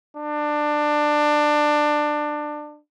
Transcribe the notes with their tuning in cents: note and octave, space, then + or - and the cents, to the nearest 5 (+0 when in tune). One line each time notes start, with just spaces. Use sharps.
D4 +20